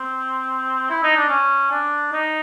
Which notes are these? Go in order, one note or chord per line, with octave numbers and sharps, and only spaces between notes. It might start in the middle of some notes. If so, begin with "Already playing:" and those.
Already playing: C4
E4
D#4
D4
C#4
D4
D#4